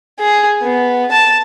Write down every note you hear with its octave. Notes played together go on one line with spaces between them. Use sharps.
G#4
B3
A5